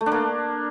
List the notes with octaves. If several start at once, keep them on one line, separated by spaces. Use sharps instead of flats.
A3
D4
A#3